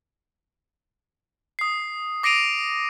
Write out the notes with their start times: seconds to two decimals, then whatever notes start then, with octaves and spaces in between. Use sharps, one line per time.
1.59 D#6 C7
2.23 D6 A#6 C7 D7 D#7 F7